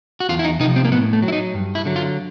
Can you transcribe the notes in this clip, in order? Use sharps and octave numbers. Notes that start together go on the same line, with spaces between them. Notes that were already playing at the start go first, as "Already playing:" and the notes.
F#4
E2 F4
E4
D#4
C3 F3 D#4
C4
A#3
A2 B3
A3
F#3
E4
D#4
G2
E4
D3 F#3
F4